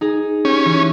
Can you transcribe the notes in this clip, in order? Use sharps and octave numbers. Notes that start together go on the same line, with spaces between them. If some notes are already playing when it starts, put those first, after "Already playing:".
D#4 G#4
C#4 G4
E3